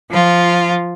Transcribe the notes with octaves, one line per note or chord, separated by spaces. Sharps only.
F3 F4